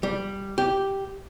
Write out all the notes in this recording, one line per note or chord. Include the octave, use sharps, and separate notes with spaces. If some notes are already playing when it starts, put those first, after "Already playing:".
G3
G4